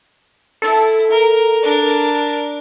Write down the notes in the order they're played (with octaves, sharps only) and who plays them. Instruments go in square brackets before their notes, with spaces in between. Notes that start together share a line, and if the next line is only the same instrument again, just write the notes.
[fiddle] E4 [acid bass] A4
[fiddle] A#4
D4 A#4